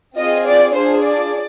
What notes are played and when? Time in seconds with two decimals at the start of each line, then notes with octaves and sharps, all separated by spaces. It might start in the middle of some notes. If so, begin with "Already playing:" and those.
0.17 C4 F4 G#4 D#5
0.46 D5
0.74 D4 F4 G#4 C5
1.03 D5